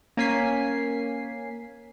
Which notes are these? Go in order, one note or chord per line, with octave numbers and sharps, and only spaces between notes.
A#3 C#4 G#5 B6 C7